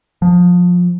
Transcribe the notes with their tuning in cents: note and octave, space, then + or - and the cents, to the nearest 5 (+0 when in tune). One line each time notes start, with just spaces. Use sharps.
F3 +25